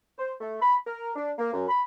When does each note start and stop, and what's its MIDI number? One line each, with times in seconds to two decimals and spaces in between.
0.18 0.33 72
0.41 0.56 57
0.62 0.77 83
0.87 1.12 70
1.16 1.32 62
1.38 1.52 58
1.53 1.65 42
1.68 1.82 83